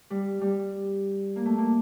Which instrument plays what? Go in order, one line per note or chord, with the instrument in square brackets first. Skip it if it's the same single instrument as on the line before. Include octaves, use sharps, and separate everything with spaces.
[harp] G3
G3
A#3
A3
A#3